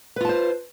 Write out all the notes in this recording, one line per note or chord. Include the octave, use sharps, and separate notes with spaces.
F4 B4 C5 A5